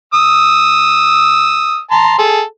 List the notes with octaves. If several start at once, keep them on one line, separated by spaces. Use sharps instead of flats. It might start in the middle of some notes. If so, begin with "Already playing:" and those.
D#6 E6
A5 A#5 C6
G#4 A4